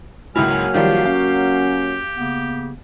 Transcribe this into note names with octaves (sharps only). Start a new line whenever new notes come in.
C#2 G#2 F#3 A#3 E4 F#4 G#5 F6
D#3 F3 G3 G4 F5
C#4 F5
C#3 A#3 B3